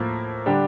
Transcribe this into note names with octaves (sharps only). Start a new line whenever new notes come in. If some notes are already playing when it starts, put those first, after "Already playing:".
Already playing: A2 F3 A#3 F4
D3 G3 D4 G4